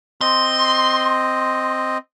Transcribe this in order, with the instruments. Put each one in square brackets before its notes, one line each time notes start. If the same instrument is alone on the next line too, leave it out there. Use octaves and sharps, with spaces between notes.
[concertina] C4 D#5 [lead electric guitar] C6